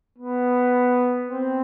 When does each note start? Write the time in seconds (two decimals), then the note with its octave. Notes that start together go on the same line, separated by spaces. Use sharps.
0.18 B3
1.29 C4